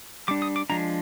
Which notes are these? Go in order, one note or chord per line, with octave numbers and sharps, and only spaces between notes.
G3 D4 D6
D#6
D6
F3 G#3 D4 A#5